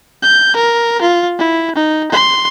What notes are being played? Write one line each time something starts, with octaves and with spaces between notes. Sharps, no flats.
G6
A#4
F4
E4
D#4
C6